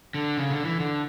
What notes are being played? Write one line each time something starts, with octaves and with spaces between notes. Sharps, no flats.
D3
C#3
D3
E3
D3